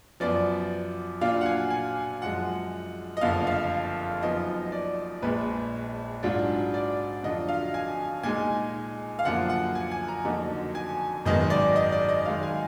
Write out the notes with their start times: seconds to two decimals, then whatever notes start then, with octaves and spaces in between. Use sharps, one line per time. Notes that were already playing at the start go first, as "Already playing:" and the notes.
0.20 F#2 F3 B3 D5
1.21 A#2 F#3 D4 F4 F5
1.41 F#5
1.46 G#5
1.70 G#5
2.21 F#2 F3 G#3 F#5
3.17 D#5
3.21 F#1 F2 D3 F3 F5
3.47 F5
4.22 F#2 F3 B3 D#4 D#5
4.72 D5
5.22 A#1 A#2 G#3 B4
6.23 G#2 F#3 D4 F4
6.74 D5
7.23 F2 D3 F#3 D4 F4 D#5
7.48 F5
7.74 G#5
8.23 A#2 G#3 D#4 G#5
9.19 F5
9.25 F#2 D3 F3 A#3 F#5
9.49 F#5
9.75 G#5
9.91 G#5
10.08 A#5
10.25 F2 D3 F#3 A#3 D#4
10.75 G#5
11.26 G#1 F#2 D#3 G#3 B3 D#5
11.50 D5
11.76 D#5
11.92 D5
12.09 D#5
12.26 F#2 D#3 G#3 F5
12.43 G#5